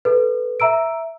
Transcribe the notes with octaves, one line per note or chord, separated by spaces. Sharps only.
A4 B4
E5 A#5 E6 D7